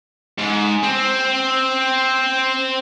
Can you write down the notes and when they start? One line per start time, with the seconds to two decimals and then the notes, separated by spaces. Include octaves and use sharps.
0.39 G#2
0.84 C4